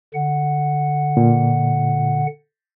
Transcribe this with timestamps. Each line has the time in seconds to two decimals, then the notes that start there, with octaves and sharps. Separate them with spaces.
0.14 D3 F#5
1.17 A#2